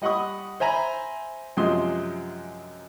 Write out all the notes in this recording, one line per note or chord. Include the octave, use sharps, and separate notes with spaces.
G3 D#5 F#5 B5 C#6 D#6
C5 E5 G#5 A#5 B5
F#2 C3 F3 G#3 C6 D#6